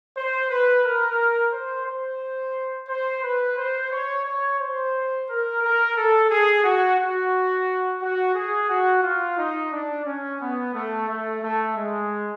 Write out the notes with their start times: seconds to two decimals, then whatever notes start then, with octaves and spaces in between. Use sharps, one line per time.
0.17 C5
0.50 B4
0.84 A#4
1.53 C5
1.87 C5
2.89 C5
3.24 B4
3.57 C5
3.92 C#5
4.26 C#5
4.60 C5
5.29 A#4
5.63 A#4
5.97 A4
6.30 G#4
6.64 F#4
6.99 F#4
8.01 F#4
8.35 G#4
8.70 F#4
9.03 F4
9.38 D#4
9.72 D4
10.06 C#4
10.41 B3
10.74 A3
11.09 A3
11.42 A3
11.77 G#3